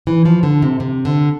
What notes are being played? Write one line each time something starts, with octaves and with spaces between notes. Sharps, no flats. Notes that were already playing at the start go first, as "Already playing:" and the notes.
E3
F3
D3
C3
C3
D3